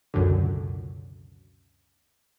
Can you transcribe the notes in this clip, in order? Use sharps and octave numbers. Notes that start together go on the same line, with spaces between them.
C#2 F#2 B2 D3